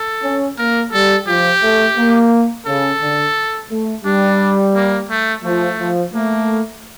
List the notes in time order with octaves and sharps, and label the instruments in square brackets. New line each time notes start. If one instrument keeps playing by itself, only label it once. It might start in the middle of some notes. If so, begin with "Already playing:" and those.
Already playing: [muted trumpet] A4
[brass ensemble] C#4
[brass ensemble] A#3 [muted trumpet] A#4
[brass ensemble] G3 [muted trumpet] A4
[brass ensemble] F3 [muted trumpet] G4
[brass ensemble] A3
A#3
[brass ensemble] C#3 [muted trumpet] A4
[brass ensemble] D3
A3
[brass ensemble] G3 [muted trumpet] D4
[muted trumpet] A#3
A3
[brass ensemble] F3 [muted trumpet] A3
[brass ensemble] F3
[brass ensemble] A3 [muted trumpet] A#3